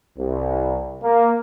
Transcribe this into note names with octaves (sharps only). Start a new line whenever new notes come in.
C2
A#3